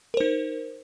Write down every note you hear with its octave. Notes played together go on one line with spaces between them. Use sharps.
D#4 A#4 C5